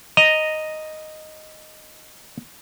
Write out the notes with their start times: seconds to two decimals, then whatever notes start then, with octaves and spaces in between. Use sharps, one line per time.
0.17 D#5 A#5